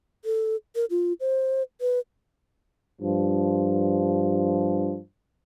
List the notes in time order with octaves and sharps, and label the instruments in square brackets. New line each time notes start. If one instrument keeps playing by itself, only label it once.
[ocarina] A4
A#4
F4
C5
B4
[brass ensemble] G2 F3